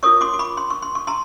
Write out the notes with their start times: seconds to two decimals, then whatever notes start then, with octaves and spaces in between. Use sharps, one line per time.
0.03 F4 A#4 C#5 C#6 D#6
0.21 C6 D6
0.34 D6
0.39 B5 C#6
0.57 C6
0.70 C#6
0.82 C6
0.95 C#6
1.07 A#5 C6